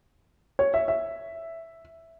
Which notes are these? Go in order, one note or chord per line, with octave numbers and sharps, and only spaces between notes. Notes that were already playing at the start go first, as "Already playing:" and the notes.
C#5
E5
E5